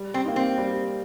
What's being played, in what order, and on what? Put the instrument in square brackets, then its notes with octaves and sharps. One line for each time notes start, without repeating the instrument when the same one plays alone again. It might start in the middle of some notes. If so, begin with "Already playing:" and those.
Already playing: [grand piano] G3
[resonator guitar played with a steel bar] C4
[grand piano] A#3 D#4
[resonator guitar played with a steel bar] C4
[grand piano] G3